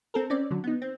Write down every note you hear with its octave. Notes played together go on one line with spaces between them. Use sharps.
C4 A4 A#4
C4 C#4 D5
D3 F#3
B3 D#4
C4